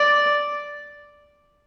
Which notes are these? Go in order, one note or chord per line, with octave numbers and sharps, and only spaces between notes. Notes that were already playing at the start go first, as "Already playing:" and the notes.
Already playing: D5